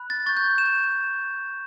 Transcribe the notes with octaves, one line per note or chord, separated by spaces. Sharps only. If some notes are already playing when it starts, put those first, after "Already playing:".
Already playing: B5 F#6
A6
C#6 G6 A6
G6
E7